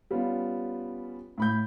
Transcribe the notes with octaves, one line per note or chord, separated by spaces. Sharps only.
G3 B3 C#4 F4
A2 B5 G6